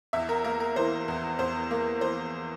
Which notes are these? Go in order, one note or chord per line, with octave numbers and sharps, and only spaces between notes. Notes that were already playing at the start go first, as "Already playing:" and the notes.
E2 E5
A#4
A#3 A#4
A#4
E3 C5
E2
E2 C5
A#3
E3 C5